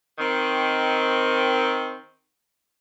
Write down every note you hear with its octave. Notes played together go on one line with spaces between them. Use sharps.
D#3 C4